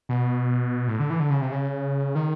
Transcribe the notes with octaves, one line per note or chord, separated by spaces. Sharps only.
B2
A2
D3
E3
D3
C#3
C3
C#3
D#3